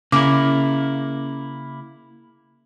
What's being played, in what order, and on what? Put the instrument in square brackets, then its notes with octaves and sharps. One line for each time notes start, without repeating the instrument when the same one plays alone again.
[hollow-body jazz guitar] C#3 [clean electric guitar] A#3 E4 [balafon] D6